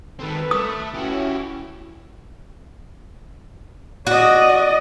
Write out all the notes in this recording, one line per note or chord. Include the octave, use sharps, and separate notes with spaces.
D#3 C4 A4 B4
A3 D#6
C#4 E4 F#4 G4
F#4 D5 D#5